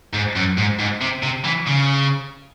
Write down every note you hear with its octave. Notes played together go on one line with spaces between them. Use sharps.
G#2
F#2
G#2
G#2
C3
C3
E3
C#3